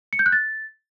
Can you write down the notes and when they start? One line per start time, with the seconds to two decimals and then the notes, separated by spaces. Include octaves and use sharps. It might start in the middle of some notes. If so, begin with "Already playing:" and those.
0.13 C#7
0.19 G6
0.26 F#6
0.32 A6